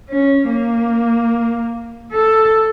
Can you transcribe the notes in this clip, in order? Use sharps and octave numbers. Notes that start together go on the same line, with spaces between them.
C#4
A#3
A4